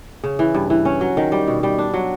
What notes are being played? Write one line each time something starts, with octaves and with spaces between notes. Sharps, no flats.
C#3
E3
G2
E3
C#4
F#3
D#3
G3
B2
G3
D4
F#3